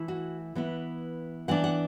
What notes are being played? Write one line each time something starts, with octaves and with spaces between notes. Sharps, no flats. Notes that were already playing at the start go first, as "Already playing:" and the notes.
Already playing: E3 A3 E4
F#4
E3 B3 E4
E3 B3 D4 F#5
F#5